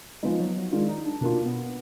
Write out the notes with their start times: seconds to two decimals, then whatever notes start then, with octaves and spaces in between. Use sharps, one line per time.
0.23 F3 G#3 B3 D#4
0.40 F#3
0.56 F#3
0.72 D#3 G#3 D4 F4
0.88 D#4
1.05 D4
1.21 B2 A#3 D4 F4
1.45 B3